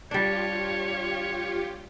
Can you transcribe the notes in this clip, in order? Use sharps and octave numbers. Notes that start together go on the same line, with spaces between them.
G3 D4 F4 G4 C#5